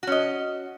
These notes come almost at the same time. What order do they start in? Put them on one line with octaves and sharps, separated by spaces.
F#4 C#4 D#5